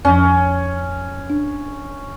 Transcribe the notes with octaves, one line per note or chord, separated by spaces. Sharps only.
F2 F3 C#4
D4